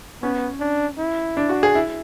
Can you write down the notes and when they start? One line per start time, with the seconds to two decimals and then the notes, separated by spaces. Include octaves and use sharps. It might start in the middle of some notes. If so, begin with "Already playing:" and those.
0.23 B3 C#4
0.60 D4
0.98 E4
1.37 D4
1.49 F#4
1.63 G#4
1.75 E4